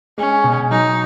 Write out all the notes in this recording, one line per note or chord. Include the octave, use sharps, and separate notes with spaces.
G#3 C#4
B2
F#3 D#4